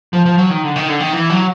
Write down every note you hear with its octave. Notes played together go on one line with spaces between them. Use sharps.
F3
F3
F#3
D#3
D3
D#3
D3
D#3
E3
F#3